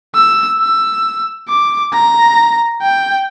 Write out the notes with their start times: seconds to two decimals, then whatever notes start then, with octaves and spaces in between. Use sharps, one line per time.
0.15 E6
0.60 E6
1.49 D6
1.93 A#5
2.82 G5